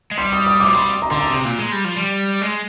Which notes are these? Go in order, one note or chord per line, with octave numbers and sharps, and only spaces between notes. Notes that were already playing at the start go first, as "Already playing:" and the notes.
G#3
G3 C6
D#6
D#6
D6
F3
G3 C6
A#5
D3 C6
A#5
C3
A#2
G#3
G3
F3
G3
G#3